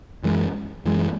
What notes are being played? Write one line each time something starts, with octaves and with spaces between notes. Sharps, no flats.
F#2 E3 G#3
F#2 E3 G#3